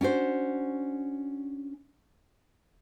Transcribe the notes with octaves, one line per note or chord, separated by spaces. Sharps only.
C#4 D4 F#4 C5